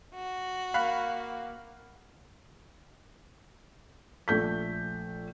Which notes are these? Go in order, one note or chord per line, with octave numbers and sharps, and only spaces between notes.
F#4
A#3 F5 B5 F#6
A#1 A3 G6 B6